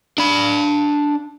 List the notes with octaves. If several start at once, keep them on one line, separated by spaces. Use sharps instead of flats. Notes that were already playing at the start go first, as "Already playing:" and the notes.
D4 B5